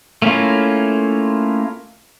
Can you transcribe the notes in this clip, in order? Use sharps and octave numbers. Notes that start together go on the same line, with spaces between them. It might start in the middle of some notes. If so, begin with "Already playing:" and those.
A3 A#3 C#4 E4 F4